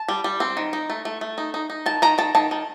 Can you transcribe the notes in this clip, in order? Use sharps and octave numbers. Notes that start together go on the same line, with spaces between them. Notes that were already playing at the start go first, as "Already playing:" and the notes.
Already playing: A5
G3
G3
C4
D#3
D#4
A3
A3
A3
D#4
D#4
D#4
D#3 A5
D#3 A#5
D#3 A5
D#3 A5
D#3